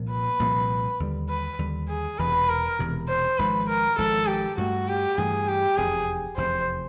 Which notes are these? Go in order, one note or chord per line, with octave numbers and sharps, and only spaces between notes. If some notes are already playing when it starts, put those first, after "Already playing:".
Already playing: C2 A#2 F3 A#3
B4
C2 A#2 F3 A#3
D#2 D3 G3
B4
D#2 D3 G3
G#4
E1 E2 C3 B4
A#4
E1 E2 C3
C5
G#1 G#2 F3 B4
A#4
G#1 G#2 F3 A4
G4
G2 E3 A3 F#4
G4
G2 E3 A3 G#4
G4
F1 E2 C3 G#4
F1 E2 C3 C5